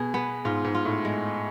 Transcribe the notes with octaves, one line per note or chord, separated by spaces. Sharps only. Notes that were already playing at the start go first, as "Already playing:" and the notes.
Already playing: B2 G#4
B3
G#2 F4
G#2
F4
A2
G#3